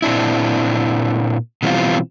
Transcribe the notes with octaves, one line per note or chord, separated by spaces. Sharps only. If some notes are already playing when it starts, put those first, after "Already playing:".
A#2 C4 D4 E4
B2 E3 G3 A#3 C4 F4